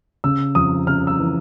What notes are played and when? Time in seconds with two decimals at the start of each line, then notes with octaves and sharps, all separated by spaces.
0.24 C#3 E6
0.55 F2 D#6
0.87 C#3 F6
1.07 E6
1.18 E3